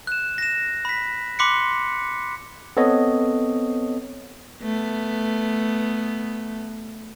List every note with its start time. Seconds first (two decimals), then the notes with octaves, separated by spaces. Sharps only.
0.07 F#6 E7
0.38 A#6 E7
0.85 B5 B6
1.39 B5 C6 D6 F#6 B6 C#7
2.77 B3 C4 A4 C#5 D#5
4.62 A3 B3